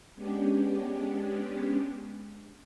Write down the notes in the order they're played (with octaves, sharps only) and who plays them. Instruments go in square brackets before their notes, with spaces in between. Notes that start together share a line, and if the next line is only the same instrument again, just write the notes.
[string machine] G#3 B3 C#4 D4 G4